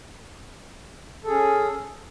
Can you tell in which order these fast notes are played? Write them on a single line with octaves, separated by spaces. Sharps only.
A4 G#4 C#4